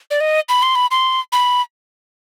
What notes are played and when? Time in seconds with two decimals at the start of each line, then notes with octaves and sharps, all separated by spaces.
0.11 D5
0.20 D#5
0.49 B5
0.62 C6
0.75 B5
0.91 C6
1.32 B5